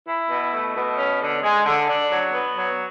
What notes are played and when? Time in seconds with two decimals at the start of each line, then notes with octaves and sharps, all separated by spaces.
0.07 E4
0.29 B2
0.53 A3
0.75 B2
0.97 C#4
1.20 D3
1.43 G#3
1.65 D3
1.88 D4
2.10 F#3
2.33 B3
2.56 F#3